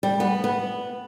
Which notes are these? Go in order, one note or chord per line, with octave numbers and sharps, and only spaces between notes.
G3
B3
B3